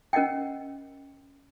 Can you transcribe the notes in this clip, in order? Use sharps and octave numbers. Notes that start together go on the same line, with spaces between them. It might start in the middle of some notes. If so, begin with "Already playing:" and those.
C#4 A#4 D#5 F#5 G5